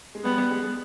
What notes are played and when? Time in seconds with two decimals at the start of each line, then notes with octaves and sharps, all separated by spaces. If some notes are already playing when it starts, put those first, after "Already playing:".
0.15 G#3
0.24 G3 B3
0.38 G3
0.51 G#3
0.63 G#3